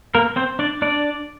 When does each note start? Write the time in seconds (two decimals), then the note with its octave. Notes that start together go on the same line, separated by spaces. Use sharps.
0.15 A#3 A#4
0.36 C4 C5
0.59 D4 D5
0.82 D4 D5